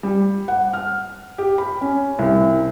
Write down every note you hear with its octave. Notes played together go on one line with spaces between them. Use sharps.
G3
F#5
F6
G4
B5
C#4
C2